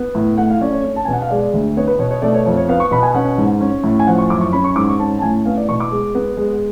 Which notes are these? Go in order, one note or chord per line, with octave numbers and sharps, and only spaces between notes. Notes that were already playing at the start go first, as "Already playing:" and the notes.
Already playing: B3
A2
A3 F#5
F5
C#4 D5
C#5
C#4
A5
B2 G#5
F#5
F5
G#3 D5
D2
B3 C#5
B4
B2 C#5
C#5
A3 D5
C#5
F2 C#5
C#5
B3 F5
C#6
B2 B5
G#5
C#4 F#5
G#2
C#4
A2
G#5
F3 F#5
C#6
F#2 D6
C#6
C#4 B5
C#6
G#2 D6
C#6
C#4 A5
A5
A2 G#5
B3 F5
D5
B2 C#6
D6
G#3
B3
G#3